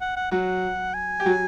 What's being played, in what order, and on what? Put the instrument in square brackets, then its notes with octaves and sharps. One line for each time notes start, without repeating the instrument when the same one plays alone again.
[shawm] F#5
F#5
[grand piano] F#3 F#4 [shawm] F#5
[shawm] G#5
[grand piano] G4
F#3 F#4